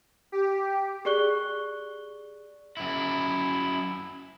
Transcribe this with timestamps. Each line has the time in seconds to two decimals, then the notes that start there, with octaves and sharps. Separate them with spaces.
0.32 G4
1.05 G4 G#4 D5 C#6 F#6 G7
2.77 F#2 E4